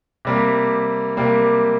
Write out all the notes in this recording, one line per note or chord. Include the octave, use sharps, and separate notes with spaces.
C3 G3 A#3
C3 G3 A#3